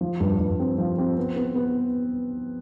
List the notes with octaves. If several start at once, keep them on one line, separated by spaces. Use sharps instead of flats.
F3
G2
G2
C4
F3
C4
B3
B3
B3